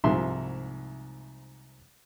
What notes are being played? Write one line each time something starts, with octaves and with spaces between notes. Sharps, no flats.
C2 G#2 C3 F3 E5 C6